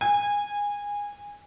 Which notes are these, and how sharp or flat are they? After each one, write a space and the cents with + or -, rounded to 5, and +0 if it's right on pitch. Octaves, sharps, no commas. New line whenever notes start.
G#5 -20